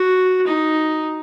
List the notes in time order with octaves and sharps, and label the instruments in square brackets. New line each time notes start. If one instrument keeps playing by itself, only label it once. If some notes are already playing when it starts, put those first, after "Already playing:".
Already playing: [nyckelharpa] F#4
D#4